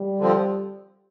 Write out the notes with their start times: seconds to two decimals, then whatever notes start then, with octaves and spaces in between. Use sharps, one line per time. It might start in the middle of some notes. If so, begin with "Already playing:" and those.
Already playing: G3
0.19 D3 F3 C4